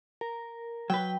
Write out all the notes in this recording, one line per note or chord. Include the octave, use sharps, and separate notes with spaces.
A#4
F#3 B4 G5